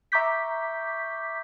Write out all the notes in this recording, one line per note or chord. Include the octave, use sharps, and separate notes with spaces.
E5 A#5 C#6 D6 G6 B6